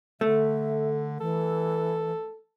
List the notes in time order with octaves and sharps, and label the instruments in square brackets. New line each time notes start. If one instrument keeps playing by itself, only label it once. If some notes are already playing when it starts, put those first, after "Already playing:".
[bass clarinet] D3 [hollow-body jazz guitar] A3 [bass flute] E5
[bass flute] E3 [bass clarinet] A4